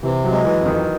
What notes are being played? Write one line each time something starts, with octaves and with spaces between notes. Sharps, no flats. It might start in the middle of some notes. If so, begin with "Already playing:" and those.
C3 E3
F#3
G#3
E3
F2
D#3